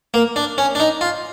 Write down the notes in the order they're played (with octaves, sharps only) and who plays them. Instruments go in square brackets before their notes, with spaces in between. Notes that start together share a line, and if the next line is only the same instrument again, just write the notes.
[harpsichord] A#3
D4
C#4
D4
D#4
F4